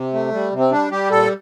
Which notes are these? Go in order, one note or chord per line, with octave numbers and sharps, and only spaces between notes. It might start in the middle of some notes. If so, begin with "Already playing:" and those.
Already playing: C3
A3
G3
C3
C4
G3 D4
G3 G4
A#2 A4